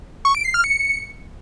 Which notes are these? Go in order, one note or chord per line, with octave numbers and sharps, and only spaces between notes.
C#6
D7
C7
F6
C#7